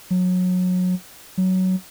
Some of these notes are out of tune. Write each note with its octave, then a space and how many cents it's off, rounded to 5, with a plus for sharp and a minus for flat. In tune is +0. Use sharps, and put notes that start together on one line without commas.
F#3 -25
F#3 +10